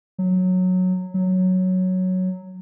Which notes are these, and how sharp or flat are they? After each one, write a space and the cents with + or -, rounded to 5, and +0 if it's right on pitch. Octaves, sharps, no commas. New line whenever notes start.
F#3 -10
F#3 +0